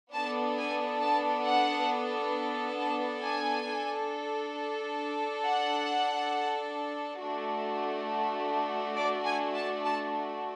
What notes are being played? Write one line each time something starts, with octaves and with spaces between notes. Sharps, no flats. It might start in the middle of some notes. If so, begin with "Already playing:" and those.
B3 D4 A4 A5
G#5
A5
F#5
A5
G#5
D4 A4
F#5
A3 D4 F#4
D5
G#5
A5
A5